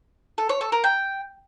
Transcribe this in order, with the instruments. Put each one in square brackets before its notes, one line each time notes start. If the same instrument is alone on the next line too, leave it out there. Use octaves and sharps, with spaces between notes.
[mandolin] A4
C#5
A4
A#4
G5